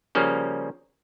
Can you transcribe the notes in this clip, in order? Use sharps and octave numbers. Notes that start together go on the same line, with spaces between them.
C#3 F3 G3 A#3 C#4